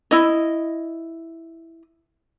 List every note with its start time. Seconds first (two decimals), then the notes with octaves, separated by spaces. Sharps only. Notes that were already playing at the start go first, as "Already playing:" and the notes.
0.11 E4 D#5